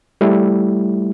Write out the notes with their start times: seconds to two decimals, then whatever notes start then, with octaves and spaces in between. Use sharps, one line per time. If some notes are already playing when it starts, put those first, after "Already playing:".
0.21 G3 A3 E4